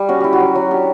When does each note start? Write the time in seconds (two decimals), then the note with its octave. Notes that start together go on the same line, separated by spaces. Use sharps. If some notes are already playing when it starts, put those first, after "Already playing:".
Already playing: G3
0.09 C#4 F#4
0.21 E4 G4
0.33 F#4
0.40 F#3
0.55 F#3
0.71 D4 G4